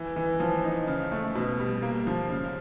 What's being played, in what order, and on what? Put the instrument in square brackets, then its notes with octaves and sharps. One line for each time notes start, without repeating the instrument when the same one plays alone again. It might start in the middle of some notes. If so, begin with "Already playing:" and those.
Already playing: [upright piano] E3
E3
F3
D#4
C#3
A3
B2
G3
A#3
F3
C#3